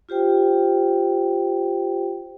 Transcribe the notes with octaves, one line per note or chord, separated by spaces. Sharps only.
F4 G4 C5 G5